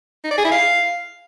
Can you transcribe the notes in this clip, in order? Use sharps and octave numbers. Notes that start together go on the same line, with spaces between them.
D#4
D5
G#4
E4
F5